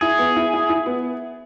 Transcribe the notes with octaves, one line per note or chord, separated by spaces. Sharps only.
E4 G#4
B3
E4
E4
E4
B3